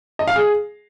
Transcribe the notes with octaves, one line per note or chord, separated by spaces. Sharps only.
D#5
F5
G#4